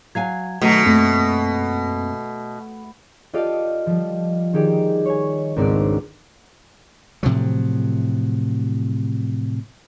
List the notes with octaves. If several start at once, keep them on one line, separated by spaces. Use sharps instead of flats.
F#3 F5 G#5 G#6
B2 D#3 F#3 A3
F#2 A3 A#3 C4
F4 G4 A4 D5 D#5 F5
F3 G3
D#3 D#4 G4 G#4 D5
C#5 G#5
G#1 C#2 G#2 C4 D4 D5
A2 C3 F3 F#3